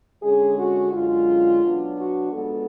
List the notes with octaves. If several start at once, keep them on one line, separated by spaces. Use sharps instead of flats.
D3 G#3 C#4 G#4
F#4
F#2 D3 G#3 C#4 F4
B2 F#3 B3 D4
F#4
G#2 F3 G#3 B3 D4 A4